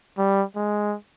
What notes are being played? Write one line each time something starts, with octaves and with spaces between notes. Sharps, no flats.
G3
G#3